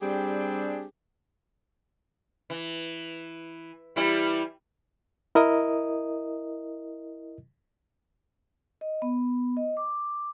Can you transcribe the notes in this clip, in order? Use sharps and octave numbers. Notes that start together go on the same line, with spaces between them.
G3 C4 D4 G4 G#4
E3
E3 G3 E4
E4 A#4 D#5 D#6
D#5
B3
D#5
D6